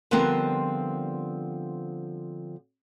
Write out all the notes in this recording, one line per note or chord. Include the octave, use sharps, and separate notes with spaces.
D3 F3 G3 B3 C4 A#4